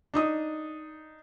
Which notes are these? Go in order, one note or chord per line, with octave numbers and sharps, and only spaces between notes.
D4 D#4 D#6